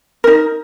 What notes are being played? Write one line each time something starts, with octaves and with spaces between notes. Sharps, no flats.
D#4 A#4